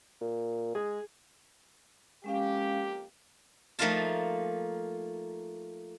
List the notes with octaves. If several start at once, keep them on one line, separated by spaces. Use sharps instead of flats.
A#2
G#3 G#4
F2 G#3 A#3 C#4 G4 F5
F3 A3 A#3 D#4 F4 A5